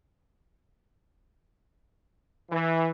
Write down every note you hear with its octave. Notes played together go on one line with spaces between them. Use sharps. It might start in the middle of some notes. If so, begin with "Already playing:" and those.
E3